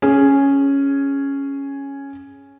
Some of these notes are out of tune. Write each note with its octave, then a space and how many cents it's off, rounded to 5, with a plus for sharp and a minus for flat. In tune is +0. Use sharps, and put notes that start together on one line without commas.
C#4 +0 G#4 +0